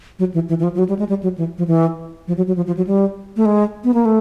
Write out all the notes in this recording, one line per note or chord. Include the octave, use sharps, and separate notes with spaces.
F#3
E3
E3
E3
F3
F3
F#3
G3
G#3
G3
F#3
E3
F3
E3
F3
F#3
F#3
F3
F3
F#3
G3
A3
G#3
B3
A#3
A3